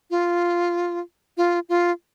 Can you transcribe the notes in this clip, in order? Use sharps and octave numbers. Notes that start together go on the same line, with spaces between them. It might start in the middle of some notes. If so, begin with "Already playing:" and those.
F4
F4
F4